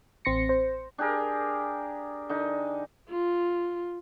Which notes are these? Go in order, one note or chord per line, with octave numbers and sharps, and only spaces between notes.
A1 C4 C6 A#6 C#7
C5
D4 G4 G#4 A#4
D3 D#4
F4